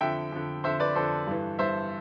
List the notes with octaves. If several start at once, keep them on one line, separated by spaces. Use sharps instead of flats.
F2 D3 E5 G5
F2 D3
F2 D3 C5 E5
B4 D5
F2 D3 A4 C5
G2 E3
G2 E3 C5 E5